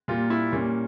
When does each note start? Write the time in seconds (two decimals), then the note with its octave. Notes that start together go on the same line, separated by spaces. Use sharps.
0.08 A#2 G3 A#3 F4
0.30 E4
0.52 A#2 G3 A#3 C#4